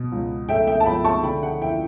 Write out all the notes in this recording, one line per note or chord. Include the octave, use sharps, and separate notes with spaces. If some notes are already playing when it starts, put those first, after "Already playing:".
Already playing: B2
C#2
A3 E5 G5
E5 G5
A5
C#2 G5 B5
A5 C#6
D3 G5 B5
F#5
E2 E5 G5